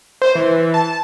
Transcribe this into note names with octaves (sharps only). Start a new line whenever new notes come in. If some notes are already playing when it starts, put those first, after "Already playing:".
C5
E3
A5